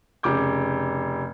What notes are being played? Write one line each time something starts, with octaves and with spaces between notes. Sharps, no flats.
F1 C#3 D6 G6